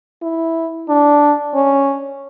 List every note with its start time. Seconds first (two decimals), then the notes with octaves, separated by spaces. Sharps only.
0.23 E4
0.89 D4
1.54 C#4